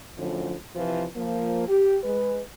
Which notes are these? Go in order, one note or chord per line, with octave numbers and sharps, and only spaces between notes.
F#2 A2 D3 F3
C3 E3 F3
F3 A#3
G4
G#3 B4